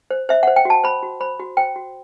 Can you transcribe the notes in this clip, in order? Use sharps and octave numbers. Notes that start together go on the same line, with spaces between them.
C5
C5 E5
C5 F#5
G5
F#4 A5
C5 B5
F#4
C5 B5
F#4
C5 G5
F#4